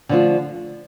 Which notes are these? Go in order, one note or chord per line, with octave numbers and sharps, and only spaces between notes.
D3 F3 A3 D4 F4